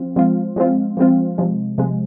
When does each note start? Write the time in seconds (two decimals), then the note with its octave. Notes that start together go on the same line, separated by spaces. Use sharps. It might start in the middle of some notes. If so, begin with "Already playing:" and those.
Already playing: F3 C4 F4
0.16 F3 G#3 C4 F4
0.56 F3 G#3 C4 F4
0.97 F3 G#3 C4 F4
1.38 C3 F3 G#3
1.78 C3 F3 G#3